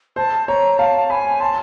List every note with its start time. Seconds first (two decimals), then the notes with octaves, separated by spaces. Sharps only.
0.16 C5 A5
0.48 C#5 A#5
0.78 F5 A5
1.10 G#5 B5
1.40 A5 C6